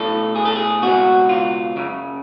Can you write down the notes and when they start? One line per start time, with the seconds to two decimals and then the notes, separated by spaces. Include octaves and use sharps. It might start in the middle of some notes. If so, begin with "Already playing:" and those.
Already playing: B1 A2 A4
0.35 G#4
0.45 A4
0.56 G#4
0.82 C#2 B2 F#4
1.29 F4
1.76 F#2 C#3